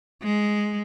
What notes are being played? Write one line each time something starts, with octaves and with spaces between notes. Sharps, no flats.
G#3